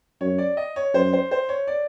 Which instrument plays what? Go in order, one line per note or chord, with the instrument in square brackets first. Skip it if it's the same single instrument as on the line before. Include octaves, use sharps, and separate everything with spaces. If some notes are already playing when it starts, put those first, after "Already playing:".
[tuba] F#2 [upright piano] C#5
[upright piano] D5
D#5
C#5
[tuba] F#2 [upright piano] C5
[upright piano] C5
C5
C#5
D5